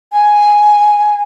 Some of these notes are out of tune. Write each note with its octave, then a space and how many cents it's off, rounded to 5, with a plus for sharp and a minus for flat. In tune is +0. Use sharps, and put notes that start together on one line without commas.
G#5 +0